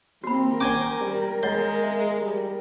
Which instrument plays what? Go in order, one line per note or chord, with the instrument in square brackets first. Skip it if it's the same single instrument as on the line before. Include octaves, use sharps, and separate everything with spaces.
[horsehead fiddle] A#3 C4 [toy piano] F#4 B5
[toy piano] C#4 C#6 [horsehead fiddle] A#4 [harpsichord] C5 G#5 D6
[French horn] G3
[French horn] G#3 [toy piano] C#5 D#5 F#5 [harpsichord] C6
[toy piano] E5
[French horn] G3